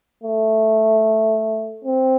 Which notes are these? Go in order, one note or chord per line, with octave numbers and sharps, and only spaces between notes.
A3
C4